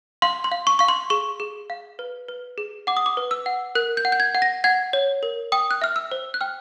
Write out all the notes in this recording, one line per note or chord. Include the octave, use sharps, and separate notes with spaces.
F5 C6
C6
F5
C#6
F5 C#6
C6
G#4 C#6
G#4
F5
B4
B4
G#4
F#5 D6
D#6
D6
B4
E6
F#5
A#4 F#6
G6
F#5
G6
G#6
F#5
A#6
F#5 G#6
C#5
A#4
G5 D#6
F#6
E5 F6
E6
C5
F#6
G5 F6